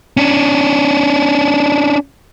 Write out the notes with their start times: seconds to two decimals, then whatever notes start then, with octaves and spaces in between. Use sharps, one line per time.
0.17 C#4 D4